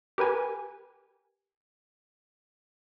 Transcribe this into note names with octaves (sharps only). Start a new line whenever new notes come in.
G4 A#4 B4 G#5